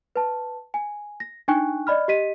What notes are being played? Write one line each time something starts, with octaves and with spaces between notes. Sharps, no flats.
B4 A5
G#5
A#6
D4 D#4 G5 G#5 C#6 F#6
D5 D#5 B5 F6
G4 D#5 B6 D#7